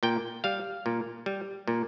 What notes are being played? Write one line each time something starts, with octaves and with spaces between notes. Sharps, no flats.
A#2 G5
G3 F5
A#2
G3
A#2